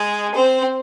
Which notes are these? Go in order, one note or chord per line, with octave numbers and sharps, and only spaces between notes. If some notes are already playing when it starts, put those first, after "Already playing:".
Already playing: G#3 G#4
C4 C5